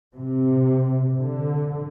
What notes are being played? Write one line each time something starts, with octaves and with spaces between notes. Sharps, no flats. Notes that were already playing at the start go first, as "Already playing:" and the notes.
C3
D3